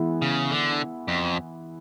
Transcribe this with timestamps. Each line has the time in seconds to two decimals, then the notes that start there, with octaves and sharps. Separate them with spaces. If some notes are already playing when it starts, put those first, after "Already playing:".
Already playing: E3 G#3 B3 E4
0.22 C#3
0.51 D3
1.08 F2